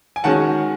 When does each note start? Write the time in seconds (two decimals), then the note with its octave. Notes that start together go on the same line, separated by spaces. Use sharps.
0.16 G#5
0.24 D#3 G#3 C#4 F#4 F#5 A5